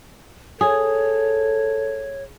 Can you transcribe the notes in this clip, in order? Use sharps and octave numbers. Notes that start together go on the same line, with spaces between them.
G#4 A4 C#5